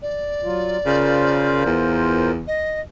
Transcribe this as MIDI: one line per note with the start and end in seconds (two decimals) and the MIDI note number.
0.02 1.68 74
0.44 0.78 54
0.44 0.78 65
0.86 1.63 49
0.86 2.32 65
0.86 2.32 70
0.86 2.32 72
1.66 2.47 40
2.47 2.80 75